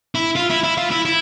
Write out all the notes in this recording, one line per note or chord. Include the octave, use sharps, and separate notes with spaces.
E4
F4
E4
E4
F4
E4
E4